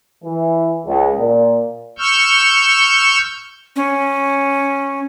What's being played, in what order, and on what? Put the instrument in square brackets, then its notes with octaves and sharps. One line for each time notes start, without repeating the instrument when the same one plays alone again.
[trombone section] E3
C#2
A#2
[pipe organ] C#6 E6 F6 G6
[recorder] C#4